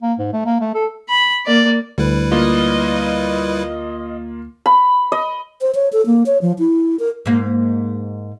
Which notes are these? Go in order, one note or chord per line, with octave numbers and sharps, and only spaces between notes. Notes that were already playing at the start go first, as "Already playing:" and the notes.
A#3
G#2
A3
A#3
A3
A4
B5
A#3 D5
D2 G3 E4 B4
A#3 F4 D#5
B5
D#5
C5
C#5
A4
A#3
C#5
F3
E4
A#4
G#2 A#3